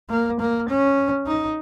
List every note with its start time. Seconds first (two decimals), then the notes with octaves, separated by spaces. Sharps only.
0.10 A#3
0.40 A#3
0.69 C#4
1.27 D#4